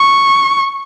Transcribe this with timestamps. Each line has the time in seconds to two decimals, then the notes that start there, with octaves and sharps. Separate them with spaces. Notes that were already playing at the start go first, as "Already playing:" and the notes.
Already playing: C#6